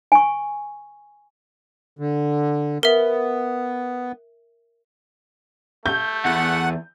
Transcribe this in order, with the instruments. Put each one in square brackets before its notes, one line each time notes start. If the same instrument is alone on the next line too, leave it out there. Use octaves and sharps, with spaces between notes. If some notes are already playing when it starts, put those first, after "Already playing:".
[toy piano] G#5 C#6
[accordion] D3
[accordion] B3 [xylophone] A#4 E5
[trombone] A3 [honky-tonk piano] G6
[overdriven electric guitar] E2 [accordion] F#5